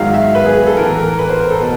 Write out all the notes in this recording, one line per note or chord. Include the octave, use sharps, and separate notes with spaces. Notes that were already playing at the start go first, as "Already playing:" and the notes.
Already playing: G#2 D#3 F#3 F5
E5
B4
G#4
G#4
A4
A2 E3 A3 A#4
A#4
B4
C5
A#4
A4
B2